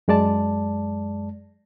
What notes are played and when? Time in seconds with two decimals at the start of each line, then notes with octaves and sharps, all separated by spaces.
0.08 F#2 G#3 D5 A5